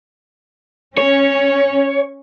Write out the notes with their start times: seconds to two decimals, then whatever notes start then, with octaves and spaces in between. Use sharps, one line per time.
0.98 C#4 C#5